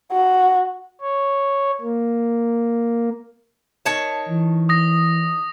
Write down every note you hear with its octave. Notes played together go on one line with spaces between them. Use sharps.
F#4
C#5
A#3
D#3 C#5 A5
E3
D#6 A#6